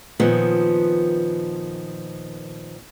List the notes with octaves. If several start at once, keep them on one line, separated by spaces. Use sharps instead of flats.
A#2 D#3 F3 B3